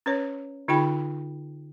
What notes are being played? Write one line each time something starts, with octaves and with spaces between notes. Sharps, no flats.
C#4 B4 C#5
D3 D#4 F4 G#4 G5 B5